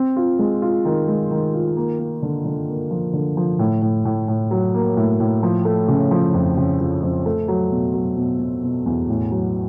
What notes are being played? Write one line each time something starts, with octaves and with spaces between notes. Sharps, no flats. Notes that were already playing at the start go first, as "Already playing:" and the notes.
Already playing: C4
F4
G#3
F4
D#3
G#3
D#3
F4
A#3
A#3
D3
D3
A#3
F3
D3
F3
A2
A2
A2
A2
F#3
A#3
A2
A2
F3
A3
C#3
F3
F2
C#3
F3
F2
A3
F#3
B2
F#3
B2
B2
B2
E2
A2
F#3